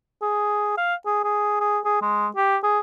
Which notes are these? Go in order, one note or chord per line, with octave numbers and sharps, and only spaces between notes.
G#4
F5
G#4
G#4
G#4
G#4
G#3
G4
G#4